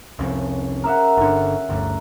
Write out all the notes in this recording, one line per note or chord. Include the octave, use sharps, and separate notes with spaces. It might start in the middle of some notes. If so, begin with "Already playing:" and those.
C2 F2 C#3
A#4 E5 F#5
G1 D3
G1 D2 G2